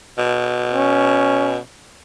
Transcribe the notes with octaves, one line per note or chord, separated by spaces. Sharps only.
B2
C#4